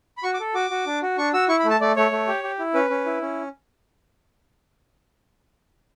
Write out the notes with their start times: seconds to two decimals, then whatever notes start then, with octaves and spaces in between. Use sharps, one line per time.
0.17 B5
0.23 F#4 C#6
0.34 D6
0.40 A4
0.55 F#4 D6
0.70 F#4
0.86 D4
1.03 F#4
1.18 D4 C#6
1.33 F#4 E6
1.49 E4 C#6
1.59 B5
1.64 A3
1.70 A5
1.80 A3 D5
1.96 A3 C#5
2.11 A3
2.28 G4
2.44 G4
2.59 E4
2.74 C#4 B4
2.90 C#4
3.06 E4
3.21 C#4